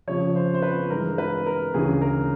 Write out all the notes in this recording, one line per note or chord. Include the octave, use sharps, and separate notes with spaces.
F2 C#3 F3 C#5
C5
C5
B4
G2 E3 G#3 A#4
B4
A#4
D2 C#3 E3 G#3 G#4
A#4